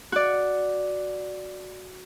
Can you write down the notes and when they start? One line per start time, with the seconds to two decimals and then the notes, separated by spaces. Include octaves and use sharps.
0.12 F#4 D5